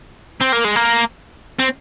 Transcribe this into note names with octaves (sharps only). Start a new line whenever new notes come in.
C4
A#3
G#3
A#3
C4